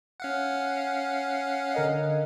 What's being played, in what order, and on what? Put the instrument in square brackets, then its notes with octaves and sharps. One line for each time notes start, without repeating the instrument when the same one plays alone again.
[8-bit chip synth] C#4 F5 F#5
[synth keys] D3 A#4 D#5